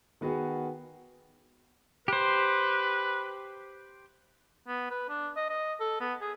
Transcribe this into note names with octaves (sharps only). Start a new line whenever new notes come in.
D#3 B3 F#4 G#4
G4 B4 C5
B3
B4
D4
D#5
D#5
A4
B3
G#4